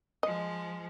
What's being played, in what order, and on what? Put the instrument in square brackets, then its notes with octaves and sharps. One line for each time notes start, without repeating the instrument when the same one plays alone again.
[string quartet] F3 G#3 [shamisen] D#5